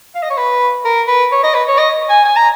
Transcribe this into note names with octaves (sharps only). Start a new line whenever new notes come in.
F5
D#5
C#5
B4
A#4
B4
C#5
D#5
B4
C#5
D#5
G#5
G#5
A#5